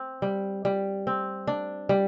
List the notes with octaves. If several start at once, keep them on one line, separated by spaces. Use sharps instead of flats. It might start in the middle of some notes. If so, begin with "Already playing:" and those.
Already playing: C4
G3
G3
C4
D4
G3